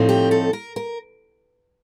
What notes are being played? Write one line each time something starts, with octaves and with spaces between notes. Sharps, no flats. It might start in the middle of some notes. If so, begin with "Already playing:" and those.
Already playing: A2 F3 A3 C4 D#4
G4
A4
A#4
A#4